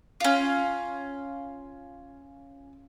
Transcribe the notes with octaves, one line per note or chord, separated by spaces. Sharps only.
C#4 F4